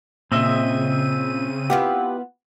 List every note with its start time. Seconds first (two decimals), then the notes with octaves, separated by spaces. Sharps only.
0.32 A#2 C#3 C4 D#5 E5 D#7
1.70 B3 E4 F4 G4